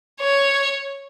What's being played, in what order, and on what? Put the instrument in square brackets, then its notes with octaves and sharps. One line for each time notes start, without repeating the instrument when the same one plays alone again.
[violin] C#5